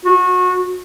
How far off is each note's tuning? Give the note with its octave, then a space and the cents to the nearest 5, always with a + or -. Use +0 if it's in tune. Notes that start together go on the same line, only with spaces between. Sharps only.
F#4 -25